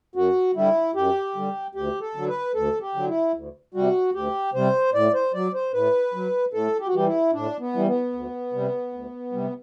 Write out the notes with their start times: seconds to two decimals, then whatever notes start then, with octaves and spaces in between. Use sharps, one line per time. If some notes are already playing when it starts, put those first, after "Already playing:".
0.15 F#2 F#4
0.55 D3 G3 E4
0.95 F#2 G4
1.35 D3 G3
1.75 D2 G4
2.01 A4
2.15 D3 F#3
2.28 B4
2.55 D2 A4
2.81 G4
2.95 D3 F#3
3.08 E4
3.35 D2
3.74 C3 G3 F#4
4.14 D2 G4
4.54 C3 G3 C5
4.94 A2 D5
5.14 C5
5.34 F#3 D5
5.54 C5
5.73 A2 B4
6.14 F#3
6.53 A2 A4
6.80 G4
6.87 F#4
6.93 E3 G3 G4
7.07 E4
7.33 A2 D4
7.59 B3
7.73 E3 G3
7.86 B3
8.13 D2
8.53 C3 G3
8.93 D2
9.32 C3 G3